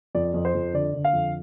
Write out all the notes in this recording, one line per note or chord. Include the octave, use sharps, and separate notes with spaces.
F2 D5
F2
C5
F2
D3 D5
D3
F5
F2